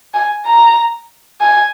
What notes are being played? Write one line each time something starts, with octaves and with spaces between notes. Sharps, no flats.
G#5
A#5
G#5